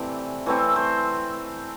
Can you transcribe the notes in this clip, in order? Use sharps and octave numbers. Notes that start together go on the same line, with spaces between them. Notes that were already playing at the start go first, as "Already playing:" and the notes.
Already playing: C3 E3 A3 C4 D5
E3 A3 C4 C#5
C5